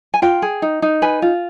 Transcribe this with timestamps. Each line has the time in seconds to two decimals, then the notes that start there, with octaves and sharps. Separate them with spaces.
0.14 G#5
0.22 F4 G5
0.42 G#4
0.62 D#4
0.82 D#4
1.02 B4 G#5
1.22 F4